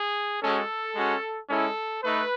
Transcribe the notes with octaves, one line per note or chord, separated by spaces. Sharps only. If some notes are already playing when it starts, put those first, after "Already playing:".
Already playing: G#4
G#3 C#4 F#4 A4
G#3 C#4 F#4
G#3 C#4 E4 A4
A3 D#4 B4